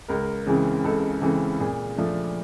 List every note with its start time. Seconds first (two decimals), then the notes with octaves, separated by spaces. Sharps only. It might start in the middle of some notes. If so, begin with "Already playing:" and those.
0.08 C#2 A#4
0.47 C#3 E3 G#3 C4
0.84 C#2 A4
1.22 C#3 E3 G#3 C4 A4
1.60 A#2 G#4
1.98 F3 A3 D4